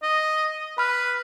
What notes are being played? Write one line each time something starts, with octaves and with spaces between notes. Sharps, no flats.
D#5
B4 B5 F6